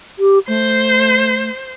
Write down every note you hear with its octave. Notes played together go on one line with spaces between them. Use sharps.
G4
A3 C5